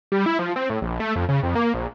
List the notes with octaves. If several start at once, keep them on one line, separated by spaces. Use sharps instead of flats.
G3
E4
F3
C4
A2
A#1
A3
F2
C#3
F2
A#3
A#1